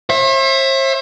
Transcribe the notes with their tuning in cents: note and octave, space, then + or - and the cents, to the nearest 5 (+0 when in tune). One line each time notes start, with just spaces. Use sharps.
C5 +45 E5 +10